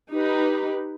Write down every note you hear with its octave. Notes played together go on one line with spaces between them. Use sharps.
D#4 G4 B4